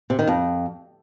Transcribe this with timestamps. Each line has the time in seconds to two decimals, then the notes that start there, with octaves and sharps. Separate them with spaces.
0.10 C3
0.19 D#3
0.27 F2